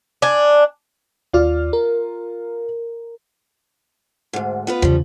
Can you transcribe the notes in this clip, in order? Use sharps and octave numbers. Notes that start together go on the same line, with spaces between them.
D4 G#5
D#2 F4 D5 F6
A#4
D2 G#2
B3 F4 B4
E2 C#3 F3 G3